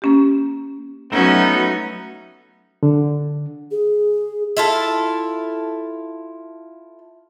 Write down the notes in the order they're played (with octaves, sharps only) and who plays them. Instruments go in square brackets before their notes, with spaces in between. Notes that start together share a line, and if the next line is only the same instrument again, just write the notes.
[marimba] A#3 C#4 G4
[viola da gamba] F#3 C#4 [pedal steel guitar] A3 D#4 [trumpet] B3
[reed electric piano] D3
[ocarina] G#4
[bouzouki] E4 F4 A4